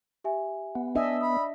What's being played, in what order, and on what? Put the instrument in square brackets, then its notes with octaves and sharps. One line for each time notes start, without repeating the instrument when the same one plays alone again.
[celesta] G4 E5 G#5
[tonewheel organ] B3
[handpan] D4 D#5 E5 [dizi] G#5
[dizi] B5 [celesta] D#6